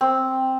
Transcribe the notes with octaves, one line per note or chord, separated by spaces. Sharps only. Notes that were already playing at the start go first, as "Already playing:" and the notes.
C4